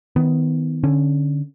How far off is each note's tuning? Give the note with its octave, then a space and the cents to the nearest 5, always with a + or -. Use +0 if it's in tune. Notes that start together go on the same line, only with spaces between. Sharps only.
D#3 +25 B3 +20
D3 +0 C#4 -15